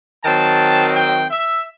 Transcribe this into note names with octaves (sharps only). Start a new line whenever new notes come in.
D#3 F#3 C4 A5
G5
E5